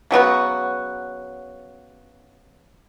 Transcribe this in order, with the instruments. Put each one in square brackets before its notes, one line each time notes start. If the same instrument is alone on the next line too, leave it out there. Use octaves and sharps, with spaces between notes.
[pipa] C#3 F#3 B3 F#4